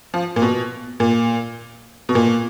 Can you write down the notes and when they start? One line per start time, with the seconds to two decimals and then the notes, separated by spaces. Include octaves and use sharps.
0.14 F3
0.36 A#2
0.42 B2
1.00 A#2
2.09 B2
2.15 A#2